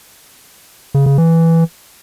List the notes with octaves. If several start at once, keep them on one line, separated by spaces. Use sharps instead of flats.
C#3
C#3
E3